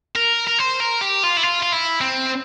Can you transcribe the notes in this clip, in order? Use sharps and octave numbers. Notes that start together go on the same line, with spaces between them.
A#4
A#4
C5
A#4
G4
F4
E4
F4
F4
E4
C4